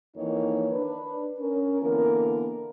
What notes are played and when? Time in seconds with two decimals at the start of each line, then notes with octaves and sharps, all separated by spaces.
0.15 F2 D#3 E3 A#3 D#4 C#5
0.71 D4 B4
1.40 C#4 A#4
1.82 D3 E3 A#3 B3 A#4